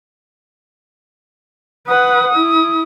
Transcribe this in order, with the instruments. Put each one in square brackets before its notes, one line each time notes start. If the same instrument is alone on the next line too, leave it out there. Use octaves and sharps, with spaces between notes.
[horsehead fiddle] B4 F#5 [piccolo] D#6
[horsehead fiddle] E4